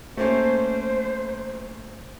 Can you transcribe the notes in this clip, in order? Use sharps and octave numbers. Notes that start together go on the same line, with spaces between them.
A3 A#3 C#4 C5